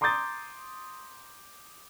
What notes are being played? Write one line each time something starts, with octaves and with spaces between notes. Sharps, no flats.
A#5 C6 D6 D#6 G6 A6